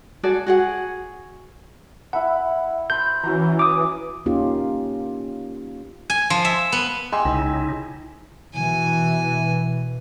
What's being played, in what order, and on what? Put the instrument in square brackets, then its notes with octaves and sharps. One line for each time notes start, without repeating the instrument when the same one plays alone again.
[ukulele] F#4 G#4 A4 D5
F#4 G#4 F#5
[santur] E4 E5 B5 [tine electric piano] F#5
[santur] C5 B5 [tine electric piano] G6
[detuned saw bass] E3 [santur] C#4 F#4 A#5
[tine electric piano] D6 D#6
[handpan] A#3 C#4 D#4 F4 G4
[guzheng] G#5
F3
E5
B3
[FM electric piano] G#3 G4 E6 [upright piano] D#5 G#5 C6
[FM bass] C2 [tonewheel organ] C#3 D#4 E4
[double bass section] B2 E3 [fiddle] G#5